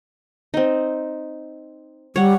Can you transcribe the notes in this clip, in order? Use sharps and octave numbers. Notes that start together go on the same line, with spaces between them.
C4 D#4
G3 C#5 F#5